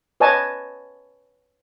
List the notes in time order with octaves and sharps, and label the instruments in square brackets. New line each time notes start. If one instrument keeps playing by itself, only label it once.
[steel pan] B4 C#5 D#5 G#5 A5